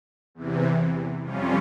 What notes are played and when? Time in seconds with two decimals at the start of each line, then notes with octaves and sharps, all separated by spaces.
0.35 E2 C3 E3
1.24 F2 C3 G3 C#4 F4